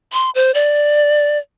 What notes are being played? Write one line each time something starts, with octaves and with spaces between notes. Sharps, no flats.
C6
C5
D5